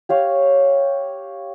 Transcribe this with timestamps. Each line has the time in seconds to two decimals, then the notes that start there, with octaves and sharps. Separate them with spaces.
0.09 G4 C#5 F5